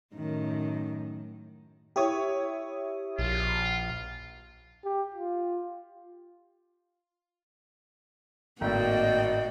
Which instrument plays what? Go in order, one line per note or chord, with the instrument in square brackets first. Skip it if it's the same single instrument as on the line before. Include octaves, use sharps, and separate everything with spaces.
[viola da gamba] F#2 A2 D#3
[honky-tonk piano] E4 C#5 [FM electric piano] G4 D#6
[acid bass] A#1 [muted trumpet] F4
[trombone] G4
F4
[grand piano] G#1 A2 [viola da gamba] A#3 F#4 [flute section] D5 D#5 [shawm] G5